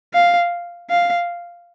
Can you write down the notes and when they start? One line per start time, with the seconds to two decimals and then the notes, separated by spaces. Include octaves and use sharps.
0.14 F5
0.90 F5